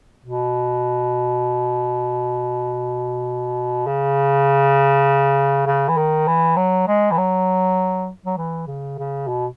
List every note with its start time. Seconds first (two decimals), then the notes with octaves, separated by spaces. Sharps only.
0.25 B2
3.87 C#3
5.67 C#3
5.89 E3
5.97 D#3
6.28 E3
6.57 F#3
6.88 G#3
7.11 E3
7.18 F#3
8.26 F#3
8.37 E3
8.67 C#3
8.98 C#3
9.28 B2